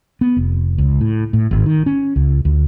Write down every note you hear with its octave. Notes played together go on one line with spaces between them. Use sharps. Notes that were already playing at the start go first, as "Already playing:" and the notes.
B3
F1
C#2
A2
A2
G#1
D#3
C#4
C#2
D2